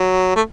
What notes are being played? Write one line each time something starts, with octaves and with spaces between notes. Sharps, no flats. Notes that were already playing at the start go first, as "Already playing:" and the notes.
Already playing: F#3
A3